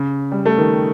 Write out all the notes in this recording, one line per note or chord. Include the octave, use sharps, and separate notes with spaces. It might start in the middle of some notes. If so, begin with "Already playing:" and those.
Already playing: C#3
G3
A3
D#3